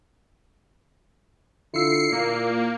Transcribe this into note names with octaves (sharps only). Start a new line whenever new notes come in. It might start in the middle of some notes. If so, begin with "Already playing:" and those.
D3 E4 F4 E6 C7 C#7
A#2 A#3